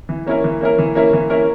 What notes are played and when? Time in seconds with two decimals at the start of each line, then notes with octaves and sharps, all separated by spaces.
0.09 E3
0.26 A#3 C#4 E4 A#4
0.44 E3
0.61 A#3 C#4 E4 A#4
0.78 E3
0.95 A#3 C#4 E4 A#4
1.13 E3
1.30 A#3 C#4 E4 A#4